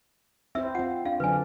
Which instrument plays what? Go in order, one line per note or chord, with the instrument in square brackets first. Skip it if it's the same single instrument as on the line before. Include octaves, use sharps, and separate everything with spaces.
[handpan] C4 E4 C5 [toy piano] E5 E6
[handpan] C4 F4 [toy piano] F#5
[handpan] D4 [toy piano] F5
[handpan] D3 F#3 D4 [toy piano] B4 G#5